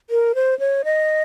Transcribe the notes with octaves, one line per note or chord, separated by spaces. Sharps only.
A#4
C5
C#5
D#5